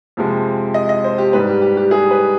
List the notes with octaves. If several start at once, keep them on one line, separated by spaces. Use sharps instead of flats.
F2 C3 F3 G#3
D#5
D#5
C5
G4
G#2 G3 B4
G4
G4
G4
G#4
B4